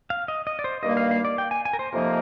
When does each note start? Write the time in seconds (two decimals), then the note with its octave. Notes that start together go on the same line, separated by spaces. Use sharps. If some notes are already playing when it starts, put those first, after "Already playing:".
0.10 F5
0.28 D#5
0.47 D#5
0.59 D5
0.64 C5
0.83 G2 D#3 G3 A#3 D#5
0.97 F5
1.11 F5
1.25 D5
1.38 G5
1.51 G#5
1.65 G#5
1.73 A#4
1.79 C5
1.92 F2 C3 F3 A#3 D#4 A#4